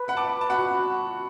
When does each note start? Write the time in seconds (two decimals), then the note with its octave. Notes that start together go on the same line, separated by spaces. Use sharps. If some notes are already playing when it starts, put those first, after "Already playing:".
Already playing: B4
0.08 F#5 B5
0.17 A5 D6
0.41 A5
0.49 F#4 F#5 B5